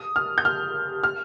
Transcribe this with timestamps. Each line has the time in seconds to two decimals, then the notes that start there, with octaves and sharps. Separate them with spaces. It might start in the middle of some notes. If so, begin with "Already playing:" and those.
Already playing: D#6
0.16 F6
0.38 G6
0.45 F6
1.04 F6